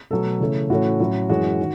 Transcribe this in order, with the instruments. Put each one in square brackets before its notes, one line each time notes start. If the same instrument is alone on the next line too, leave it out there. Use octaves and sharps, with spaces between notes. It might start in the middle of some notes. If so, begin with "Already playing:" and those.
[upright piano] B2 F#3 A3 A4
C#3 E3 A3 C#4
A2 E3 A3 C#4 F#4
A2 F#3 C#4
F#2 E3 G#3 C#4 F#4
D#3